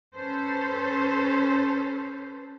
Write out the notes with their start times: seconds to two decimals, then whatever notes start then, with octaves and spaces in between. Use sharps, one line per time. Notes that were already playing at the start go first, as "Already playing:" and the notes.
0.14 C#4 A4 B4 C5